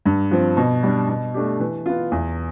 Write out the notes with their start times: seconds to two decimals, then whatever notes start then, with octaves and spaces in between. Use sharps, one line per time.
0.06 G2
0.31 F3 C4
0.57 B2
0.83 G3 D4
1.09 B2
1.34 A3 D4 G4
1.60 E3
1.86 B3 F4
2.12 E2